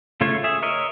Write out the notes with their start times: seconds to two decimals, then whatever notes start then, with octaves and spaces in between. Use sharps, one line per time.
0.21 C#3 A3 F4 C#5
0.44 G#4 E5
0.62 A#4 C#5 D#5 E5